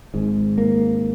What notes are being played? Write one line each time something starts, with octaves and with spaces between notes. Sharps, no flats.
G#1 G#2
A#3